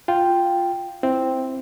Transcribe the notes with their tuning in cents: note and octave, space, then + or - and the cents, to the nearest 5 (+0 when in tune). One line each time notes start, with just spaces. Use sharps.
F4 +0 G5 +0
C4 +0 E4 +0